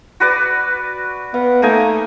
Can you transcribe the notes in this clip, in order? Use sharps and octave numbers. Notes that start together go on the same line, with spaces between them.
F#4 B4 D5
B3 F5
A3 A#3 D#4 G#5